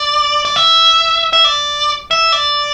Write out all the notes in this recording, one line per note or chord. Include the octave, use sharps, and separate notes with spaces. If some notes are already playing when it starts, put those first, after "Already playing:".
Already playing: D5
D5
E5
E5
D5
E5
D5